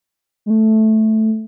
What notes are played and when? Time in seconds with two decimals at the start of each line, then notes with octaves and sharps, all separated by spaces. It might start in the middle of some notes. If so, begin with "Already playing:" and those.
0.46 G#3
0.50 A3